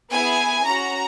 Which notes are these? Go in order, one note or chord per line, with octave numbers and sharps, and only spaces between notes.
B3 E4 G#4 G#5
C#4 F#4 A#5